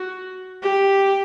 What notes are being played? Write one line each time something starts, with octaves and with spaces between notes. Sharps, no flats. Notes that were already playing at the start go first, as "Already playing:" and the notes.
Already playing: F#4
G4